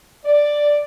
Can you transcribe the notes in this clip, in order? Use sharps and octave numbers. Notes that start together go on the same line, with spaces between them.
D5